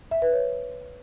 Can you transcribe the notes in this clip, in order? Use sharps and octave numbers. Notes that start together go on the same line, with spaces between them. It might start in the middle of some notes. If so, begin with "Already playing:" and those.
E5
B4
C#5